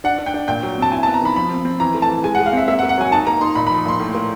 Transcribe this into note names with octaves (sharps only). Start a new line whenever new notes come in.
D4 F#5
D4
G5
D4
A#2 G5
F#3
C4 A5
E4 G#5
A5
B3
A#5
D#3 B5
F3 B5
C4
C4
E3 A#5
A3
A5
E3
G#3 G#5
F#5
G#3
F5
C4 E5
A#3 E5
F#5
A#3
F#5
F#3 G#5
D#4 A5
A#3 A#5
D#4 C6
A#2 B5
B5
F3
A#2 C6
A2
A#3